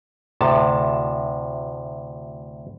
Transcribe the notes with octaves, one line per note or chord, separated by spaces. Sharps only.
D2 A2 C3 A5